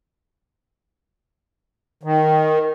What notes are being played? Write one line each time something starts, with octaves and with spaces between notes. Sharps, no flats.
D#3